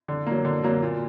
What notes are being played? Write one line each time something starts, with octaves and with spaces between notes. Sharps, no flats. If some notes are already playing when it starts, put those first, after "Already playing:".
D3
F#3 A#3
D3
F#3 A#3
A#2